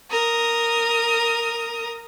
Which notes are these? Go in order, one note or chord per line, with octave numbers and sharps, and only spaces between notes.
A#4 D#6